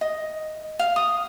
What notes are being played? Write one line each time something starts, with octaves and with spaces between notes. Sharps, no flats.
D#5
F5
D#6